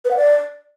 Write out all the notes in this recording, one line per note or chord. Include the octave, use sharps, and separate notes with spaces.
B4
F#5
D5